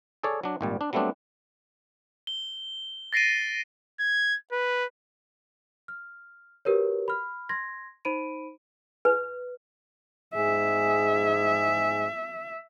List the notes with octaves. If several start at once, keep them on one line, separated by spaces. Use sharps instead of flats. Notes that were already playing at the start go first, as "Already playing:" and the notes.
G#4 A4 C#5 D5
F#3 D4
G#1 A#2 G3
D4
F#3 G3 A3 B3 C4 D4
G7
A6 A#6 C7 D7 D#7
G#6
B4
F6
F#4 G4 A#4 B4 C#5
B5 F6
C6 G#6 A#6
D#4 C5 B5 D7 D#7
B4
G#2 G#4 E5